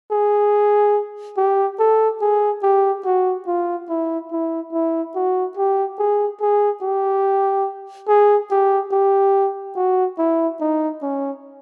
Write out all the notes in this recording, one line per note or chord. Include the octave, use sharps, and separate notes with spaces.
G#4
G4
A4
G#4
G4
F#4
F4
E4
E4
E4
F#4
G4
G#4
G#4
G4
G#4
G4
G4
F#4
E4
D#4
C#4